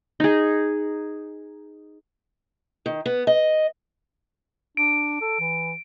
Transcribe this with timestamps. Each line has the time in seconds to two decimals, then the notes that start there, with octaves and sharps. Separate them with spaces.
0.20 D#4 G#4
2.86 D#3
3.06 B3
3.27 D#5
4.77 D4 D7
5.21 A4
5.40 E3